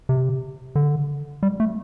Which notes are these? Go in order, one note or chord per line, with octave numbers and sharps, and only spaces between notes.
C3
D3
G3
A3